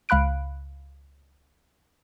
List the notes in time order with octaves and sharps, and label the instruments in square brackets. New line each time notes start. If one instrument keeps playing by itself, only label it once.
[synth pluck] C#2 F5 B5 F#6 D7